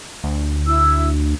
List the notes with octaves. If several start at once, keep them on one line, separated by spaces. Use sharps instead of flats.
D2
E4 E6